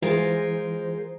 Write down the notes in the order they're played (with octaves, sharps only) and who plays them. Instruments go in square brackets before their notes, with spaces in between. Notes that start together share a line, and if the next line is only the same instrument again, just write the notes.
[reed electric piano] E3 [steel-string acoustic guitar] G#3 F4 A#4 [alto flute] C5